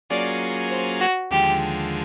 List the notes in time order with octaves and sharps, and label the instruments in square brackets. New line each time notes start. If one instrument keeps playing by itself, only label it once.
[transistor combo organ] F#3 A#3 C#4 F4 G#4 [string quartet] D5
[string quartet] C5
F#4
[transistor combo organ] D#2 D3 F3 G#3 [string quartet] G4